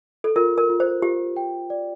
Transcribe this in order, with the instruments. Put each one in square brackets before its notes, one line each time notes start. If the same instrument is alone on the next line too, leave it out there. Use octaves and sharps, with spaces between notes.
[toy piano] A4
[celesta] F4 [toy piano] A#4
[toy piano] A#4
[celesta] F4
[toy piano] C5
[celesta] F4 [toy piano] G4
[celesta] G5
D5